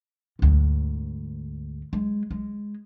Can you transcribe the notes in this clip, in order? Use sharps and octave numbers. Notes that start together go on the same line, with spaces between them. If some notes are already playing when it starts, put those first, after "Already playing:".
D2 G#2
G#3
G#3